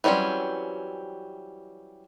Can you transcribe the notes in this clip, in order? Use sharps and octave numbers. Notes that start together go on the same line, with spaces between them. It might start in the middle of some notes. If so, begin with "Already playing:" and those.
E3 F#3 G3 C4 C#4